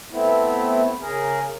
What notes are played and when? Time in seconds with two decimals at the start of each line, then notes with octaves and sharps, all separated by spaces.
0.11 A3 B3 C4 E4
1.00 C#3 G#4 A#4